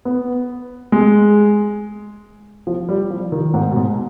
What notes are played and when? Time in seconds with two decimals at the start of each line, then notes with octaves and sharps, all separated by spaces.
0.05 B3
0.92 G#3
2.67 F3
2.89 G3
3.10 F3
3.32 D#3
3.54 G#2
3.71 B2
3.76 G#2